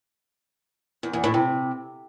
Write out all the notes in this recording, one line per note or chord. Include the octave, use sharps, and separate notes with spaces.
E2
E2
A2
C3